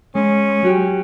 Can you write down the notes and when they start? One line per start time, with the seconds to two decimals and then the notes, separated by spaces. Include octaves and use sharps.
0.15 G#3 C#4
0.63 F#3 F#4 G4